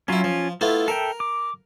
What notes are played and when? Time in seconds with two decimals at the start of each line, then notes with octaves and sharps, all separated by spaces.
0.08 F#3 C#4 E4 F4
0.24 F3
0.61 A3 B3 E4 F4
0.88 A4 A#4 E5 G5
1.20 D6